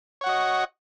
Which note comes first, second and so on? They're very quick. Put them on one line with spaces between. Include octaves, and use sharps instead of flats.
C#5 F#5 F#4 D#5